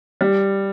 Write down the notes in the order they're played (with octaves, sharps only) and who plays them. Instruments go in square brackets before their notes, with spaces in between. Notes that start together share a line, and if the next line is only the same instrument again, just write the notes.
[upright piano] G3